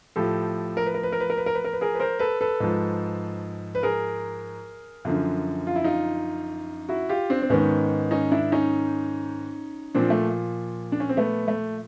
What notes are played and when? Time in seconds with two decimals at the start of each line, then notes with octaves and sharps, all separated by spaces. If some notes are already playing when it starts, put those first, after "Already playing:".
0.16 A2 F3 G4 A4
0.77 A#4
0.86 B4
0.94 A#4
1.03 B4
1.12 A#4
1.20 B4
1.30 A#4
1.37 B4
1.46 A#4
1.55 B4
1.65 A#4
1.73 B4
1.81 G#4 A#4
1.94 B4
2.00 A#4 C5
2.19 A4 B4
2.41 A4 B4
2.60 G#2 F3
3.75 B4
3.83 G#4 A#4
5.05 F#2 D3 F3
5.67 F4
5.76 E4
5.84 D#4 F4
6.89 E4 F#4
7.09 F4 G4
7.30 C4 D4
7.42 C4
7.50 G#2 D#3 B3 C#4
8.11 C#4 D#4
8.32 D4 E4
8.52 C#4 D#4
9.95 A#2 F3 C4 D4
10.10 A3
10.92 D4
11.00 C#4
11.09 C4
11.17 A3 B3
11.48 A3